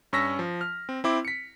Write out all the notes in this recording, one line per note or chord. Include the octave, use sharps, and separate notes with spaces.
G2 C#4 C#6 E6 A#6 B6
F3
F6
C4
C4 E4 D6
B6 C#7